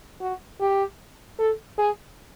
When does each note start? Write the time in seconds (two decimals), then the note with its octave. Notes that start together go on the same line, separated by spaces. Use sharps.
0.21 F#4
0.60 G4
1.39 A4
1.78 G#4